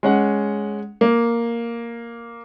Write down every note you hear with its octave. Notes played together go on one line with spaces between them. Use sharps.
G#3 C#4 F#5
A#3